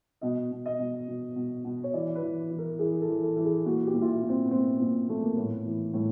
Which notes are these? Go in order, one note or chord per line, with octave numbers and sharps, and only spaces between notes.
B2 D#5
B2
D#5
B2
B2
B2
B2
C#5
E3 D5
B4
E3
E3
A#4
E3 G#4
A4
E3
A4
E3
G#4
A#2 F#4
G4
A#2
F4
E4
A#2
C4
B3
A#2 C4
A#2
A#2 A3
A#3
A2 B3
E3
A2